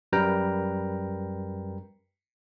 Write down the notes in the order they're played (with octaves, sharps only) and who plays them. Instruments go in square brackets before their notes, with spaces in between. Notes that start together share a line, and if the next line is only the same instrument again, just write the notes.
[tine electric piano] F#2 G3 A#4 B4 G5 A#5